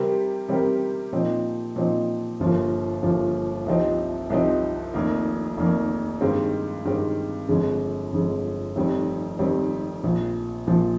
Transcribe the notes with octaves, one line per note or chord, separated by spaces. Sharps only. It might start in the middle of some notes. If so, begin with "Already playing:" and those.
Already playing: C3 G3 C4 G4 A#4
C3 G3 C4 G4 A#4
A#2 F3 C4 D#4
A#2 F3 C4 D#4
G1 G2 F3 A#3
G1 G2 F3 A#3
C2 C3 F3 C4 D#4
C2 C3 F3 C4 D#4
F1 F2 D#3 A#3
F1 F2 D#3 A#3
G2 D#3 G#3 C4
G2 D#3 G#3 C4
G1 F2 D3 G#3
G1 F2 D3 G#3
F1 F2 D#3 G3 C4
F1 F2 D#3 G3 C4
A#1 A#2 F3
A#1 A#2 F3